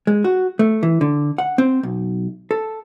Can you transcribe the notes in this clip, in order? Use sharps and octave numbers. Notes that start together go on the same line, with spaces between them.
G#3
F#4
A3
E3
D3
F#5
C4
B1
A4